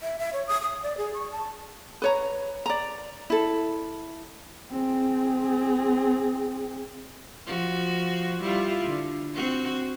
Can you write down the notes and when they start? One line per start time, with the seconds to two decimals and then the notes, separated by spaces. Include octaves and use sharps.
0.01 E5
0.19 E5
0.33 C#5
0.47 D#6
0.62 D#6
0.83 D5
0.97 G#4
1.14 C#6
1.32 A5
2.02 B4 C#5 A#5
2.66 D5 A#5
3.30 E4 A4
4.71 C4 G#4
7.46 F3 F#4
8.41 G3 E4 F4
8.85 D3
9.35 C4 F#4